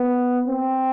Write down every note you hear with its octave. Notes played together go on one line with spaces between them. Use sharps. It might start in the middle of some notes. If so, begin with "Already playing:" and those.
Already playing: B3
C4